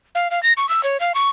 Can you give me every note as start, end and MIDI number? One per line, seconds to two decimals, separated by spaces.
0.15 0.28 77
0.31 0.42 77
0.43 0.53 94
0.57 0.69 85
0.69 0.81 88
0.84 0.98 73
1.00 1.12 77
1.15 1.30 85